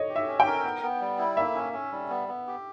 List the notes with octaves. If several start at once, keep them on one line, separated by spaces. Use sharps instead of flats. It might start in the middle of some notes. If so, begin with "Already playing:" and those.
Already playing: C#5 D#5
G4
E5
C#4
G5
A#4
B3
B3
G3
E4
A#3 E5
C#4
C#4
G3
B3
B3
G4